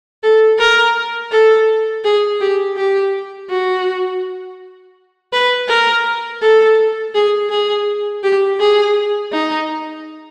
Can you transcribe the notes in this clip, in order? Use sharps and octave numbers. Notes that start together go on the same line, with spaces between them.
A4
A#4
A4
G#4
G4
G4
F#4
B4
A#4
A4
G#4
G#4
G4
G#4
D#4